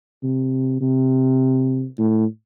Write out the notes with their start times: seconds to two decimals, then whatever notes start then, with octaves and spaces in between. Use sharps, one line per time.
0.23 C3
0.81 C3
1.99 A2